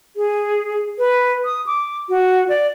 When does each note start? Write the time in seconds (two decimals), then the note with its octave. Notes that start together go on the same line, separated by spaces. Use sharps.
0.16 G#4
0.98 B4
1.45 D#6
1.66 D6
2.09 F#4
2.49 D5